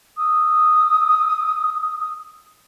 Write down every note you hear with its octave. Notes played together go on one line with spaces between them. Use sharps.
D#6 E6